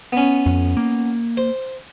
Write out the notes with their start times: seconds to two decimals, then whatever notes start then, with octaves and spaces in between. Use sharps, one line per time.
0.13 B3 C#4
0.46 F2
0.77 A#3
1.37 C5